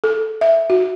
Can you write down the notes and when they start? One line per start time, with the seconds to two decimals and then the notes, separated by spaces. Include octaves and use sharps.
0.04 A4
0.41 E5
0.70 F#4